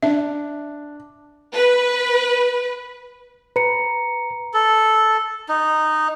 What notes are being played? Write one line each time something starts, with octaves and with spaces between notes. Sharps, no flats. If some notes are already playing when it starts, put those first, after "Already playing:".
D4 E5
B4
B4 A#5 C#7
A4
D#4